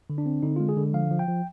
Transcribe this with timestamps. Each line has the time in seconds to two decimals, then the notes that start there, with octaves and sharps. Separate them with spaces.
0.10 D3
0.18 D4
0.26 C4
0.43 D3 D#4
0.56 G#3 F4
0.69 G#4
0.77 D3
0.94 F3 F5
1.11 F3
1.19 G5
1.28 F3